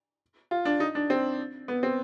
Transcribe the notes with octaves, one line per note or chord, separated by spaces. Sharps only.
F4
D4
D#4
D4
C4
B3
C4